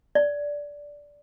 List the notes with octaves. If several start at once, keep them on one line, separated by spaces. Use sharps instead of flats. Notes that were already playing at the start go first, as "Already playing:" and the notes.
D5